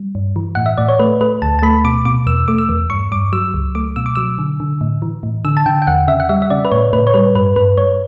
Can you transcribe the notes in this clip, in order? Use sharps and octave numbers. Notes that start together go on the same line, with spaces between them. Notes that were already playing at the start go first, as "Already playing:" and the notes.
Already playing: G3
G2
E3
A2 F#5
E5
A2 D5
C#5
A3 B4
A3 B4
D2 A5
A5
A3 B5
B2 D6
B2 D6
E2 E6
A3 D6
E6
E2
G2 C#6
G2 D6
F#3 E6
C#2
A3 D6
B2 E6
D6
F#3 E6
D3
D3
A2
E3
A2
D3 E6
A5
D3 G5
G5
E2 F#5
C#3 E5
F#5
G3 E5
E5
C#3 D5
B4
A2 C#5
A2 B4
C#5
G3 B4
G2 B4
G2 B4
G2 C#5